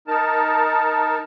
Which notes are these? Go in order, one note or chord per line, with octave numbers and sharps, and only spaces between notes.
D#4 A#4 A5